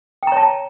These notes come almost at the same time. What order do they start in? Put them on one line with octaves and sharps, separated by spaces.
G5 A#5 C#5 A5